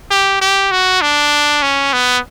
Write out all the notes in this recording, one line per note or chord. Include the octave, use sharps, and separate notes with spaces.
G4
G4
F#4
D4
C#4
B3